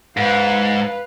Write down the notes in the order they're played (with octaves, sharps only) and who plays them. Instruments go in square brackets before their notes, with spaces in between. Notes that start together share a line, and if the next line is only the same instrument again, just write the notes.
[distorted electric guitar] G#2 [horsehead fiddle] B4 F5